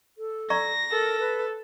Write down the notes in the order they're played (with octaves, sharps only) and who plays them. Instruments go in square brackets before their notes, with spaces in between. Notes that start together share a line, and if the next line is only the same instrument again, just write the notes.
[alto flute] A4
[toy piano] D5 A#5 C#6 [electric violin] A#6
[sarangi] A4 [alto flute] A#4
[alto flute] B4